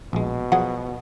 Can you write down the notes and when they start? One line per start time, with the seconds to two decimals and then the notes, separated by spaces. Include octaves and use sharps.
0.13 A#1 B2 G#3
0.52 F3 F#3 G#4 F#5